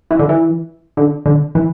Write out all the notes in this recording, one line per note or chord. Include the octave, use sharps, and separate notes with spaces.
E3
D3
E3
D3
D3
E3